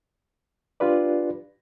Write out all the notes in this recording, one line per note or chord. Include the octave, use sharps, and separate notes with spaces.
D4 F4 G4 B4 D5